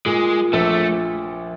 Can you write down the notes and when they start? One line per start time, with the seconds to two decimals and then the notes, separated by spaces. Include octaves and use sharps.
0.06 A#2 G#3
0.53 A#1 A3